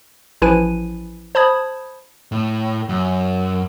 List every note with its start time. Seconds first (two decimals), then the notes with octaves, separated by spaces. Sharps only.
0.42 A1 F3 E4 B4 G#5 D#7
1.35 C5 A5 B5 D#6 G#6
2.32 A2
2.89 F#2